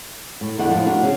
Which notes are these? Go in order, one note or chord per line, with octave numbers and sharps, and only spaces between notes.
A2
E2 A2 D3 D4 D#4 F#5
A2 F3
D4 F#4 A#4
C#3 C#4 G#4